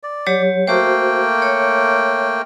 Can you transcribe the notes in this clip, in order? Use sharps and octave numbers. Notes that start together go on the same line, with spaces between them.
D5
F#3 G4 C#5
A3 A#3 F#4 C5 G5
C#5